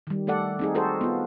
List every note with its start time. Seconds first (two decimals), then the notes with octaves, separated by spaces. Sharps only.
0.07 D#3 G3
0.27 A3 A4 D5 F#5
0.59 C4 D#4 G#4
0.75 F#4 G#4 A4 C5
1.01 B3 F4